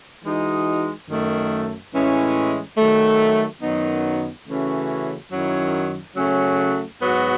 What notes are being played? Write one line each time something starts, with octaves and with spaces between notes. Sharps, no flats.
E3 G#3 D#4 F#4
F#2 D#3 A3
A2 E3 G#3 C#4 E4
D#3 F#3 A3
F#2 D#3 F#3 B3 D#4
C#3 E3 A3 C#4 F#4
F#2 D#3 F#3 C#4 E4
C#3 F#3 A3 C#4
G#2 F#3 B3 F#4